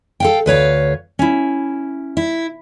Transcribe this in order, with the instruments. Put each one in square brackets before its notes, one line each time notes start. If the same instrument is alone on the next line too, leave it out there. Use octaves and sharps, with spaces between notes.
[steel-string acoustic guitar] A4 F5 G5
D2 B4 C#5 F5
C#4 E4
E4